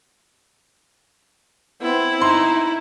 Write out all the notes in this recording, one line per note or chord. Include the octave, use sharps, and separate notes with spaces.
B3 C4 E4
D#4 C6